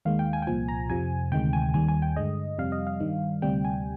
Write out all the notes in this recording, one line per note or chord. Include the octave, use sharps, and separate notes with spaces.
D#2 D#3 G#3 F5
G5
G#5
G5
C2 A#2 F3 G#5
A#5
F2 C3 F3 G#5
D2 C3 D#3 G#3 G5
G#5
D#2 D#3 G3 G#5
G#5
G5
G2 D3 G#3 D#5
F2 C3 G3 F5
D#5
F5
G2 D#3 G3
D2 C3 G3 G5
G#5